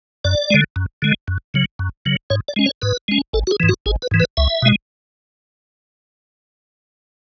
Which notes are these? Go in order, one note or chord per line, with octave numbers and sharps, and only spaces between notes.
F#2 D5
D3 G#3
F#2
D3 G#3
F#2
C#3 F#3
F#2
C#3 F#3
G#2 C#5
D5
G#3 C#4
C#5
G#2 B4
G#3 C#4
G#1 A4
F#4
G#4
G#2 E3
F#4
G#1 G#4
B4
G#2 E3
B4
C#2 E5
B2 G#3